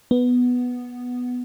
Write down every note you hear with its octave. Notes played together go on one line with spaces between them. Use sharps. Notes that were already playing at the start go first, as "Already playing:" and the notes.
B3